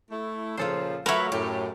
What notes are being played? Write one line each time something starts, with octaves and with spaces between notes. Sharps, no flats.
A3 E4
A#2 C#3 F3 F4 A4 C5
F#3 A3 A#4 B4 C#5 E5
F#2 A2 G4